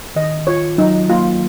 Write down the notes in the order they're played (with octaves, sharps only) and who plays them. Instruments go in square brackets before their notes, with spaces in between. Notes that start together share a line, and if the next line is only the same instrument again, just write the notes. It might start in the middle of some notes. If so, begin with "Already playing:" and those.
[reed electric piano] D#3 [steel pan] D#5
[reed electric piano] F4 [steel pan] C#5
[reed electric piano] F#3 [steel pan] D#4
[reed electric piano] A#3 [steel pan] F4